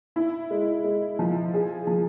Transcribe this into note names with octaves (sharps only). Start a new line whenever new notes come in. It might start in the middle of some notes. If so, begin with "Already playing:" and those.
E4
G#3
G#3
F3
G#4
F3